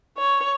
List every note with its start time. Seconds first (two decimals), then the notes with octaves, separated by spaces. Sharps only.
0.18 C#5